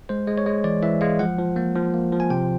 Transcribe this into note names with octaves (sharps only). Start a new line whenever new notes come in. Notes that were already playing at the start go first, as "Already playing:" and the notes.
G#3 C5
G#3
C#5
G#3
E3 D5
E3 E5
G#3 F5
F3 F#5
F3
A#3
F3
A#3
F3
G#5
C3 G5